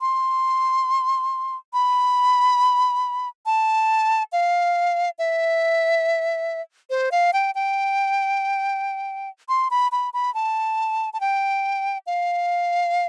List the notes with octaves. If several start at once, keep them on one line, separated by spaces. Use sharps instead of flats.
C6
B5
A5
F5
E5
C5
F5
G5
G5
C6
B5
B5
B5
A5
A5
G5
F5